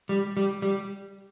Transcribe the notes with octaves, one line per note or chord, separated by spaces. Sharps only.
G3
G3
G3